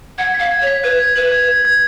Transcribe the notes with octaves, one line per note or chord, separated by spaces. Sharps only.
F#5 G#6
F5 B6
G#6
C#5
B6
B4 G#6
G#6
B4 F#7
G#6
G#6
G#6